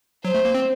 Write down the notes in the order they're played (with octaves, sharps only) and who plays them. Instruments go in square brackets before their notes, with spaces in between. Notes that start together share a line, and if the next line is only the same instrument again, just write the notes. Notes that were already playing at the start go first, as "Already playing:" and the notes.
[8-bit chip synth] F#3 [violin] C5
[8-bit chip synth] A3
A#3
C4